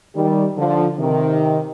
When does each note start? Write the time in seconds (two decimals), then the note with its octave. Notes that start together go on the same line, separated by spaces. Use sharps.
0.14 D#3 G3
0.56 D3 F3
0.99 C3 D#3